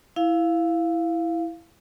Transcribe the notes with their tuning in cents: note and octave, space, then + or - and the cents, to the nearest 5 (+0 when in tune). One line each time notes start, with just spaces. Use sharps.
E4 +0 F5 +0